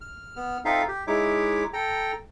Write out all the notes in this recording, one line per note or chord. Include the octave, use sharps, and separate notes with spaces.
F6
B3 F6
C4 D#4 F4 A4 E5 F5
G4
G#3 D#4 E4 C#5 E5 D6
A4 G5 A#5